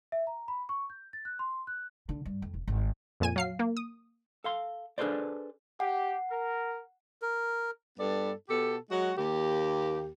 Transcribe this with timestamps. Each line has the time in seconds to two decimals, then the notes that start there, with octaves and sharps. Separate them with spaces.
0.12 E5
0.27 A#5
0.48 B5
0.69 C#6
0.90 G6
1.13 A6
1.25 F#6
1.39 C6
1.67 F#6
2.09 D3
2.26 G2
2.42 F2
2.54 E1
2.68 G#1
3.20 F2 A#2 G#5 D#7
3.36 F#3 F5 C7
3.59 A#3
3.77 D#6
4.44 A4 F5 C6
4.98 D4 G#4 A4 B4 C5 D5
5.80 G4 F#5
6.31 A#4
7.22 A#4
7.98 G2 B3 A4 D5
8.49 B2 G4 A4
8.90 F#3 G#3 F#4
9.16 D#2 A#3 G4